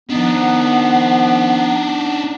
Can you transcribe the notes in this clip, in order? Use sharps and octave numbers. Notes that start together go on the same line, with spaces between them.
D#3 F3 B3 D4 D#4 F#5